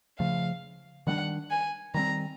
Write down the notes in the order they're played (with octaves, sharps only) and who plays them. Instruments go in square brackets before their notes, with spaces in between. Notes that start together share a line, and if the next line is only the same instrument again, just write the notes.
[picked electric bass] C#3 F3 A3 [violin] F5
[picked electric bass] D#3 G3 B3 D4 [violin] F#5
[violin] G#5
[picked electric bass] D#3 G3 C4 [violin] A#5